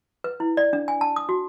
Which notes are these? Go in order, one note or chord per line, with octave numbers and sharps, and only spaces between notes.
B4
E4
D5
D4
G#5
A5
D#6
F#4